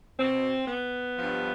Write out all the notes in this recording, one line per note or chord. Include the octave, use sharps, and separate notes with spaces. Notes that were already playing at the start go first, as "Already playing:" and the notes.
B2 C4
B3
G2 F3